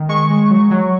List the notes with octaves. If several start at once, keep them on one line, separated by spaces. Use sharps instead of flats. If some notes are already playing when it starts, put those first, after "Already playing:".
Already playing: D#3
G#3 C#6
G#3
F#3
F#3